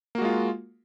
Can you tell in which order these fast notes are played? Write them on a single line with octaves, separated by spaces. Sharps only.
A#3 F#4 G#3 F4